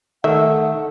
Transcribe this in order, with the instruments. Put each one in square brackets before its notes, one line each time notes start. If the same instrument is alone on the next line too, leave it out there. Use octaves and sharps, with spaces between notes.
[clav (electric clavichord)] D#3 [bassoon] A3 [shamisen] E5 [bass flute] F#5